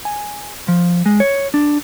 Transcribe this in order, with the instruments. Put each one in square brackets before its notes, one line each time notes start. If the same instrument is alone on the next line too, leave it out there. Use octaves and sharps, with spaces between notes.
[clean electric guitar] G#5
F3
G#3
C#5
D4